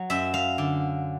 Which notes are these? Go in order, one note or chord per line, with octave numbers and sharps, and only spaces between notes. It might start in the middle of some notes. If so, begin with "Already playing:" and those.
Already playing: F#3
F#2 E5
F5
D3